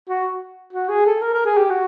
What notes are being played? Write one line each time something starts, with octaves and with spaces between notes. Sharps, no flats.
F#4
F#4
G#4
A4
A#4
A#4
G#4
G4
F#4